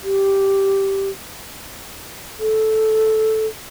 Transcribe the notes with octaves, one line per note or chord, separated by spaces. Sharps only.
G4
A4